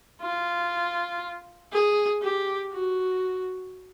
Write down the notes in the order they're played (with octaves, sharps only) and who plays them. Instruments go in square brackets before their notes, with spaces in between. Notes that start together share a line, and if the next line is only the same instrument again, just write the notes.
[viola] F4
G#4
G4
F#4